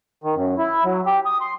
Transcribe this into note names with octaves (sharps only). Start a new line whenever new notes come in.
D#3
F#2
E4
F#3
G4
D#6
C6